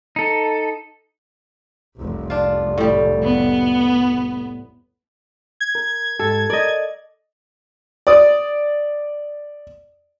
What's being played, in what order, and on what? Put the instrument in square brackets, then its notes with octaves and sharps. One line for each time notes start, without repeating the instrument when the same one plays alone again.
[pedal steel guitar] D#4 A4
[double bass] F1 C2
[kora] D4 F4
A2 G3
[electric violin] B3
[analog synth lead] G#6
[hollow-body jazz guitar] A#4
[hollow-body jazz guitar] G#2 G4 [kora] A4
[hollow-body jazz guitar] A#4 [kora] D5 D#5
[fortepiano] D5 D#6